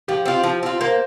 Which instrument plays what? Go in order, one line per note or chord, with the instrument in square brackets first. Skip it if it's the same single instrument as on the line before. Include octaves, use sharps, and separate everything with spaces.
[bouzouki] F3 [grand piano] G4
[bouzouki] C4 F4
F3
C4 F4
[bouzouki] A#3 [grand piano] C5